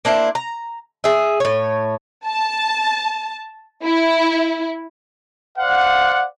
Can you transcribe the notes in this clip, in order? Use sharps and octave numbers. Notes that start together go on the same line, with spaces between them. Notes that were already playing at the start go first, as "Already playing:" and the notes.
A#3 D4 E4 C5
A#5
G#4 E5
A2 C#5
A5
E4
C5 D5 F5 F#5